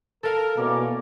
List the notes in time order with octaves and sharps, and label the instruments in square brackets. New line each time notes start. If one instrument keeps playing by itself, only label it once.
[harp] A4 F5 [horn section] A#4
[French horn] B2 [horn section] E3 G#3 C#4 [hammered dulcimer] A#3 D5 D6